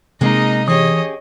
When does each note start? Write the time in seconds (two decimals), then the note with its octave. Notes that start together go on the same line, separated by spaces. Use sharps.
0.21 C3 G#3 A#3 D#4 D#5
0.68 E3 C#4 G4 G#4 C#5 D#5 D#6